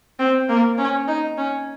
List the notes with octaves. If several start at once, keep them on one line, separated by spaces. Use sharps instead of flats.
C4
A#3
C#4
D#4
C#4